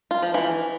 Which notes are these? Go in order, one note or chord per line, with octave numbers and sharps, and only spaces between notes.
F4
F3
E3